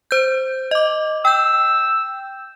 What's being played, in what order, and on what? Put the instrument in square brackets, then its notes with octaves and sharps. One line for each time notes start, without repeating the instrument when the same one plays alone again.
[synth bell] C5 G6
D#5 D6
[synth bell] G5 G6 [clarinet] E6